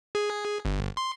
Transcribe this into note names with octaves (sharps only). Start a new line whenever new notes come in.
G#4
G1
C6